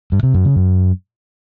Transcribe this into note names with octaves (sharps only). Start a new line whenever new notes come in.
G2
C3
F#2
C#3
F#2